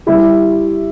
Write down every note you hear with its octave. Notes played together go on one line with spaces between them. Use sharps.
G3 E4 G4